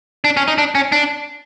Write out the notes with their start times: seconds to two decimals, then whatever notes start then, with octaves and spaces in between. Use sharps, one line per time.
0.24 D4
0.37 C#4
0.48 D#4
0.58 D4
0.75 C#4
0.92 D4